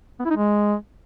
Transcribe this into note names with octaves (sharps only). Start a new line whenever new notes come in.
B3
E4
D#4
G#3